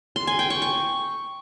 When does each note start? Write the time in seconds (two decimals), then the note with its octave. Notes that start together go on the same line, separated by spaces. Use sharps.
0.16 C6
0.27 G#5
0.39 G5
0.50 C#6
0.62 C#6